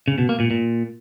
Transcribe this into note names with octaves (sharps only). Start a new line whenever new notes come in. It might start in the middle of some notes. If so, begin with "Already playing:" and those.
C#3
B2
A#3
A#2
A#2